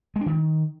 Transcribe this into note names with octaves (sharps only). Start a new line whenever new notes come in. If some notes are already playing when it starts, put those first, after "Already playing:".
G#3
D4
D#3